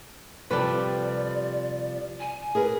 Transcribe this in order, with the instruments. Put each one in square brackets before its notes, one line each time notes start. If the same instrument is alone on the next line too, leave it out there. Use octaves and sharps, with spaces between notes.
[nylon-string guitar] C3 F3 G3 [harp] G4 A4 B4 [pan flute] D5
[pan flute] G#5
[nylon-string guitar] G#4 A#4 B4